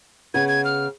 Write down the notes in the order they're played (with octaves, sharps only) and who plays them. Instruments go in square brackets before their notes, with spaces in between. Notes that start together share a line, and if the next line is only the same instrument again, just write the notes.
[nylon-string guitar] C#3 B3 B4 [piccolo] G#6
[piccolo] G#6
F6